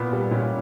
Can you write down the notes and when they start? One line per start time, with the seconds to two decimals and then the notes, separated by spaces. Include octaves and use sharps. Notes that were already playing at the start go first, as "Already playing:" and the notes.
Already playing: A#2 B3
0.13 G3
0.31 A#2 C#4